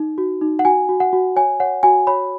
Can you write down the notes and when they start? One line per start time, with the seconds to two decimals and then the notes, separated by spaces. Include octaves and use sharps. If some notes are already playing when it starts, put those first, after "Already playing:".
Already playing: D#4
0.18 F#4
0.41 D#4
0.59 F#5
0.65 F#4 G#5
0.89 F#4
1.00 F#5
1.13 F#4
1.36 C#5 G#5
1.60 C#5 F#5
1.83 F#4 G#5
2.07 C#5 B5